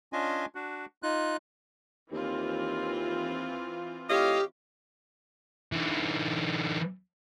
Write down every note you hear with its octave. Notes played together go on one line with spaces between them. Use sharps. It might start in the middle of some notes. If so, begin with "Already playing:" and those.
C#4 D4 F4 D#5 G#5
D4 F#4
D#4 F4 F#6
D#2 E3 C4 F4
A2 G4 C#5 D#5 F5
D3 E3